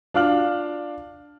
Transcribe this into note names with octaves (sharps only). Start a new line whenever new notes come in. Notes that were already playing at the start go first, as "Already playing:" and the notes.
D4 F4 F5 D6 F6 F#7